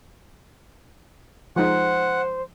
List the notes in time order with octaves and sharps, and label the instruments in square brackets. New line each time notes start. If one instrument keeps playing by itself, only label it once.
[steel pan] F3 G#3 D#4 [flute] C5 [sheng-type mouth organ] F#5